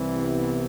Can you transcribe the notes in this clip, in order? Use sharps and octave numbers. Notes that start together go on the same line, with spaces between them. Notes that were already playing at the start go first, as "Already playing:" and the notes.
Already playing: C2 C3 E3
B3